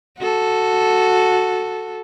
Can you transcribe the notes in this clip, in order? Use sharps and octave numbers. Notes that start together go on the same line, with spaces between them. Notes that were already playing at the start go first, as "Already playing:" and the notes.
F#4 A4